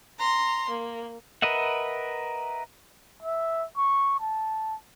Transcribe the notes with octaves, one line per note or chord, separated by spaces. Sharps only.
A#5 C6
A#3
A#4 B4 D#5 E5 F#5
E5
C#6
A5